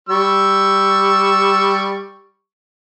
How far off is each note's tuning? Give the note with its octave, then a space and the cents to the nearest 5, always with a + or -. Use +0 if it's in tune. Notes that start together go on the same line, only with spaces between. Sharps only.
G3 +0 C#6 +0 E6 +0